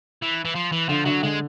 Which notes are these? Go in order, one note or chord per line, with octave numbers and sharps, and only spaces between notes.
E3
E3
F3
E3
D3 F3
D3 F#3
D3 G#3